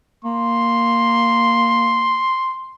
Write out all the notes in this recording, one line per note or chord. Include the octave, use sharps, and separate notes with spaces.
A#3 C6